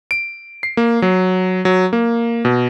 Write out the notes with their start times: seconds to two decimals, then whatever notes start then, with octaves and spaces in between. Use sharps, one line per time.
0.11 D7
0.63 C7
0.77 A#3
1.02 F#3
1.65 F#3
1.93 A#3
2.45 B2